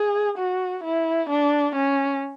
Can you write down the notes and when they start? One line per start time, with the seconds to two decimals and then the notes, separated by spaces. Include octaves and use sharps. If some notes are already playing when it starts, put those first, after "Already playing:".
Already playing: G#4
0.38 F#4
0.84 E4
1.29 D4
1.75 C#4